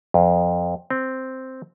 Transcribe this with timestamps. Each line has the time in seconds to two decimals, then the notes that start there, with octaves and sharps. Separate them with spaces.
0.14 F2
0.90 C4